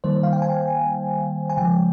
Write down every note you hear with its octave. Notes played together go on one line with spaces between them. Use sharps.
D#3 G3 A#3 C5
F5
G5
G#5
G#5
C#3 F3 G#3 G5